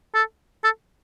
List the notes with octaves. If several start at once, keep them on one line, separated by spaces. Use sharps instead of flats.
A4
A4